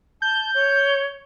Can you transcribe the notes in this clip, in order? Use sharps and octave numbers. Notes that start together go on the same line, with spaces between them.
A5 G6
C#5